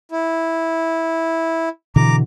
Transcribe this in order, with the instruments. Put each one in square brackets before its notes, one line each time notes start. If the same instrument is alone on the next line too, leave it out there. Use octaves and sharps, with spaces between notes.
[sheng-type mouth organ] E4
[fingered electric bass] B2 D3 E3 [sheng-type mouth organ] A#5 D6